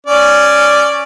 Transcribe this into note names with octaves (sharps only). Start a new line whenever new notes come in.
C#4 D5